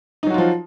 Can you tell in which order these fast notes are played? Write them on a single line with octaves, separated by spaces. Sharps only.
D#4 F#3 F#4 F4 F3